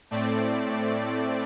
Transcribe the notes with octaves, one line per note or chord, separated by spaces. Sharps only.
A2 A3 C4 D5